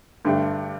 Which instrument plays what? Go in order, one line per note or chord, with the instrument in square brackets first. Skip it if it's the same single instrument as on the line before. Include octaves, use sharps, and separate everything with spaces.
[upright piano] G2 D3 A3 D4 G4